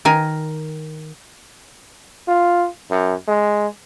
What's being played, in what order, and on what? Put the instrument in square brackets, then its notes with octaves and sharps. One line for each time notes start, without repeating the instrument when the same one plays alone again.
[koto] D#3 A#4 G#5
[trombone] F4
F#2
G#3